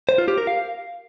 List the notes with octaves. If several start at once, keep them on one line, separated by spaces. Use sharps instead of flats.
C5
F4
G4
A#4
F5